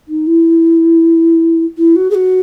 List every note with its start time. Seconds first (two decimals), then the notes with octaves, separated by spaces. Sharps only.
0.08 D#4
0.27 E4
1.78 E4
1.96 F#4
2.10 G#4
2.15 F#4